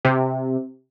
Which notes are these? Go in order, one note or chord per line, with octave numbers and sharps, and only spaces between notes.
C3